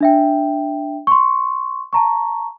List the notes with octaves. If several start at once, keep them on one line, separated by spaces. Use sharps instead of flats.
D4 E5 G5
C6 C#6
A5 A#5 C#6